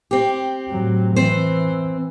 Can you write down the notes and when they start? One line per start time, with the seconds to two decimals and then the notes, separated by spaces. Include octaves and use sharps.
0.11 C4 G4
0.69 A2 F#3
1.16 E3 C4 C5